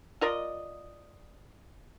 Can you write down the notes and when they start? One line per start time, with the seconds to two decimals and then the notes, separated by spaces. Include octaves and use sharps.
0.21 F4 A#4 D5 D#5